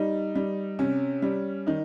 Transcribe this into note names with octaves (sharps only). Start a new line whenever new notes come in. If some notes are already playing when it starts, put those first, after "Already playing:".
Already playing: G3 D#4
G3
C3 C#4
G3
D#3 D#4